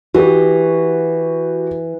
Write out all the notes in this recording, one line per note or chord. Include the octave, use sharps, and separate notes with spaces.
E3 F#4 G4